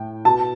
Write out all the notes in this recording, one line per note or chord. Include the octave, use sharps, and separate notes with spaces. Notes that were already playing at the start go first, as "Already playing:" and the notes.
Already playing: A2 G5
B2 A5